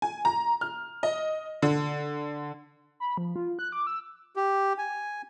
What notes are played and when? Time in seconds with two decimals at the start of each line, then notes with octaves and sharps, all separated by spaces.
0.02 G#5
0.25 A#5
0.61 F6
1.03 D#5
1.62 D3
3.00 B5
3.17 F3
3.36 F4
3.59 F#6
3.72 D6
3.87 E6
4.36 G4
4.78 G#5